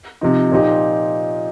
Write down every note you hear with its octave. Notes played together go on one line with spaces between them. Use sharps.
C3 F3 D#4
A#2 F3 D#4 G4